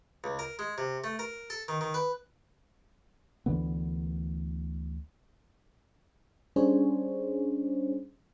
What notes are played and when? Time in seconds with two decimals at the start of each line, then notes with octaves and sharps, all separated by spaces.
0.24 C#2
0.39 A#4
0.59 G#3
0.78 C3
1.04 A3
1.19 A#4
1.50 A4
1.68 D#3
1.81 D#3
1.94 B4
3.46 D2 D3 E3 B3
6.56 G3 C#4 D4 G#4 C5 C#5